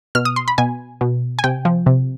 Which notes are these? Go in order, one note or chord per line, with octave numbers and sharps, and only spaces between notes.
B2 F6
D#6
C6
B5
B2 G#5
B2
G#5
C3 G5
F3
C3